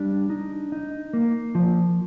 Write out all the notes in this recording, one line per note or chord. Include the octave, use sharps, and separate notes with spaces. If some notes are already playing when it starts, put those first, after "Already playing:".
Already playing: G3 D4
D#4
D#4
A#3
F3